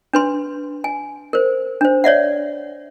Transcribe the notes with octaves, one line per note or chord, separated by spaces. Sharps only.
D4 B4 C6
G#5
A#4 C5
D4 C5
C#5 D5 E5 F#5